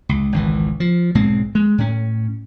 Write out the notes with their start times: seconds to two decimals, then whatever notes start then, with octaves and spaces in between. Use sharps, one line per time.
0.09 C#2
0.32 G#1 C#2 E3
0.80 F3
1.15 B1 G#2 G#3 C4
1.55 G#3
1.78 A2 C#4